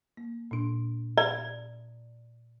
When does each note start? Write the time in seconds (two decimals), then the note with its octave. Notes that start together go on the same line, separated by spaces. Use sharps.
0.17 A#3
0.51 A#2 D4
1.18 D5